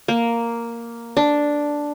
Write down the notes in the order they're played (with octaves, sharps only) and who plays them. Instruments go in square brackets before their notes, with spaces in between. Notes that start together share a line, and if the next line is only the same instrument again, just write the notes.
[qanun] A#3
D4